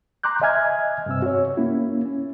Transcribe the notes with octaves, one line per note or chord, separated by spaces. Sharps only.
A#5 C6 D6 F#6 G6
D#5 E5 G#5 F6 G#6
G2 C3 C4 E6
F#4 C#5
A#3 C#4 E4
C#4